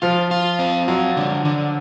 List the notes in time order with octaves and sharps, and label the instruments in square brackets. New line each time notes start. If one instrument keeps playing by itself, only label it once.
[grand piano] F3 [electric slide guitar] F4
[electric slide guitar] F4
C4
[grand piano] F#3 [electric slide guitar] F4
[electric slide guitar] D3
D3